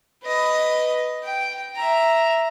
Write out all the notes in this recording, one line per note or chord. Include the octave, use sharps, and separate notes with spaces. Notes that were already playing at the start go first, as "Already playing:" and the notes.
B4 D#5
G5
E5 A#5